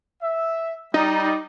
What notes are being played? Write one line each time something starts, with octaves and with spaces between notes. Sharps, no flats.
E5
G3 D#4